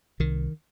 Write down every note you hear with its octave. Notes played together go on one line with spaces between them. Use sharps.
C2 D#3